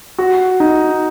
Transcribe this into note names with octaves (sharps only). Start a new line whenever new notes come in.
F#4
D#4